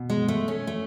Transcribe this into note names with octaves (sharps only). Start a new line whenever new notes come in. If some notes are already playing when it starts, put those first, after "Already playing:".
Already playing: B2
G#3
A3
C#4
A3